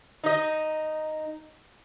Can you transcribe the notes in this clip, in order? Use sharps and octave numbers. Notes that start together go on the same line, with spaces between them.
D#4 D#5